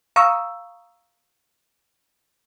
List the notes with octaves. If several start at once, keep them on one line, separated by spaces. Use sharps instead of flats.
F5 A#5 C#6 D#6 E6